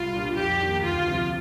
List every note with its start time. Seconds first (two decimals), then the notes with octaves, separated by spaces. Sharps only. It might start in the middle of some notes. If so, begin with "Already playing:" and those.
Already playing: C2 F4
0.13 A#2 G3 D4
0.35 F2 G4
0.59 D#3
0.64 A#3
0.83 D2 F4
1.08 C3 F3